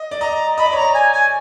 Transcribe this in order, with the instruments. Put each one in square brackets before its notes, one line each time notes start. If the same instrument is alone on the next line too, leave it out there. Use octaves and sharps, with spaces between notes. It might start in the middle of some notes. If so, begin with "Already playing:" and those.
Already playing: [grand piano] D#5
D5
[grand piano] D#5 [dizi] A#5
[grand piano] D#5 [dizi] B5
[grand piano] D5
[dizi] B5
[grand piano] C#5
[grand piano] D5 [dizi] A#5
[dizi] G#5
G#5